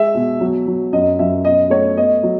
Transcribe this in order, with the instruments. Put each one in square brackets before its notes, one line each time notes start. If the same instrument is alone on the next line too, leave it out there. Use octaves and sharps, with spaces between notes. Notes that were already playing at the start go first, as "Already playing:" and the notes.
Already playing: [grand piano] G#3 E5
B2
F#3
F#3
F#2 D#5
F#2 E5
B2 D#5
A3 C#5
B3 D#5
F#3